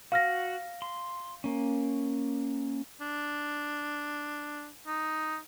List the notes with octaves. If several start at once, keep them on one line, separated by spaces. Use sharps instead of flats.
F#4 F5 F6 A#6
C6
A#3 C#4
D4
D#4